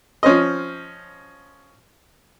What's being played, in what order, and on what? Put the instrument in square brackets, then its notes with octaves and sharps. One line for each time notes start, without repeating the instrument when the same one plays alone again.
[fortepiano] F3 C#4 C5 D#5